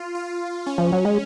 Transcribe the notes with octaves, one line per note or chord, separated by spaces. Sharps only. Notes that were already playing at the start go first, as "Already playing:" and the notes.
Already playing: F4
F4
C#4
F3
F#3
G#3